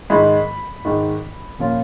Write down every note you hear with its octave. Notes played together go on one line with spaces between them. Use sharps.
G#2 D#3 G#3 D#4 B5
G#2 D#3 G#3 D#4
A#2 F3 A#3 C#4 F4